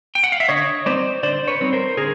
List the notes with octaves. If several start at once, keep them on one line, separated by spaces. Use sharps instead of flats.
G5
F#5
F5
E5
D3 C#5 D#5
G3 C4 D#4 C5 D5
D3 C5 D5
B4 C#5
G3 C4 D#4
A#4 C5
D3 G#4 A#4